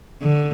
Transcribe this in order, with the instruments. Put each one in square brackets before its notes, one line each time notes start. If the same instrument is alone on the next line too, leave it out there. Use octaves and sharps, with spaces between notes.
[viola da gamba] D3